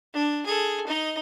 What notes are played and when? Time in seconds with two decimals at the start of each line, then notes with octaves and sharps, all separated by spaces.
0.14 D4
0.46 G#4 A4
0.87 D#4 D#5